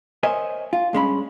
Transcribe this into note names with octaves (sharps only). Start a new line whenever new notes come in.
A#4 C5 C#5 D#5 E5 G#5
F4
G2 G#3 C#4 B5